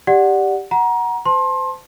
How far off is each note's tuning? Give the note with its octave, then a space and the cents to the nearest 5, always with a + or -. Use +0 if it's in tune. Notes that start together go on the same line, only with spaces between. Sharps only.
G4 +0 D5 +0 F#5 +0
F#5 +0 A#5 +25
C5 -35 A5 +0 C6 +25